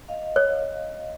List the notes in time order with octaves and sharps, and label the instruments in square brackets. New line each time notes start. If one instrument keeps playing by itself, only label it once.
[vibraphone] D#5 F5
[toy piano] C#5